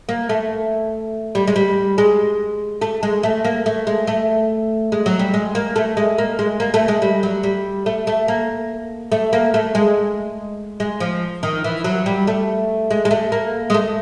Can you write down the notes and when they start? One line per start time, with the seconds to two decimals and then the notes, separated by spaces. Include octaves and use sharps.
0.09 A#3
0.29 A3
1.35 G3
1.47 G#3
1.56 G3
1.98 G#3
2.82 A3
3.03 G#3
3.23 A3
3.45 A#3
3.66 A3
3.87 G#3
4.07 A3
4.92 G#3
5.06 F#3
5.19 G3
5.34 G#3
5.55 A#3
5.76 A3
5.97 G#3
6.18 A#3
6.39 G#3
6.60 A#3
6.74 A3
6.88 G#3
7.02 G3
7.23 F#3
7.43 G3
7.86 A3
8.07 A3
8.28 A#3
9.12 A3
9.33 A#3
9.54 A3
9.75 G#3
10.80 G#3
11.00 F3
11.43 D#3
11.64 E3
11.84 F#3
12.06 G3
12.27 A3
12.91 G#3
13.05 G#3
13.11 A3
13.32 A#3
13.70 G#3
13.74 A3